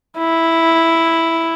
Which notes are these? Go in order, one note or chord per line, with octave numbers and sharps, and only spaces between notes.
E4